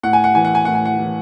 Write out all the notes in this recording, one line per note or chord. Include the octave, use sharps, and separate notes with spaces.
A2 F#5
G#5
F#5
E3 G#5
F#5
G#5
A2 F#5
G#5
F#5
E3